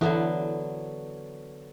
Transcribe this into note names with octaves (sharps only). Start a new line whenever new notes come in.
D3 E3 F#3 B3 E4 A4